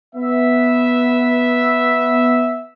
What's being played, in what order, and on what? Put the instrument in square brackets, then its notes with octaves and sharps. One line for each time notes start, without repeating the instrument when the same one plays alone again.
[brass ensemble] B3 E5